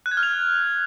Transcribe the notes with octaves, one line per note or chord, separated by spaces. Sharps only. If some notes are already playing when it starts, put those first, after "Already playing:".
F#6
G#6
F6
F7